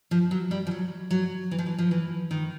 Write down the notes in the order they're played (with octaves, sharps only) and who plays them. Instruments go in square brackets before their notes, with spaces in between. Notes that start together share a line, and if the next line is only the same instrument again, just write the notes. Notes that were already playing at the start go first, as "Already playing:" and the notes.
[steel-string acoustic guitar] F3
F#3
G3
F3
F#3
F#3
E3
F3
E3
F3
E3
D#3